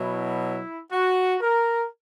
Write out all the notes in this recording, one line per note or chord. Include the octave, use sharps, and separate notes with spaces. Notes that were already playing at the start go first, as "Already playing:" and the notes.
Already playing: B2 F#3 E4
F#4
A#4